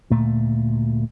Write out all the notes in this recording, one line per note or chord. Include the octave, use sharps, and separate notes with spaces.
D2 A#2 A3